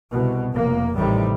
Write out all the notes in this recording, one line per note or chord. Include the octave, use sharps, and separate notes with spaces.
C2 B2
F1 A#3
A1 A2 C3 D#3 G3